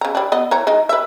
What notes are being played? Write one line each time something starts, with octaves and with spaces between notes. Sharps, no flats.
C#3 A#5
G3 D4
B3 D#5
E3 C#5 A#5
G#3 D#4
B4 E5